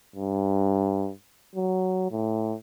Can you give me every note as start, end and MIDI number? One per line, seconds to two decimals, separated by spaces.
0.16 1.11 43
1.55 2.10 54
2.11 2.54 45